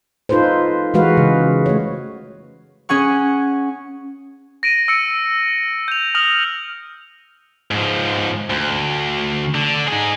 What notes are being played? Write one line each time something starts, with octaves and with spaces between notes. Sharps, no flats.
D#4 F4 A4 B4 C5
E3 G#3 F#4 B4 F5
C#3
A3 C#5
C#4 G#4 F#5 C#6
A#6 D7 D#7
E6 C#7 D7
D7
G6 F7
D#6 F6 A#6 F7 F#7
G#2 F3
D2
D3
D#4 G#4